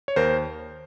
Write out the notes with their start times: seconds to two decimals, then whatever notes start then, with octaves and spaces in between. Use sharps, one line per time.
0.08 C#5
0.16 D#2 A#4 C5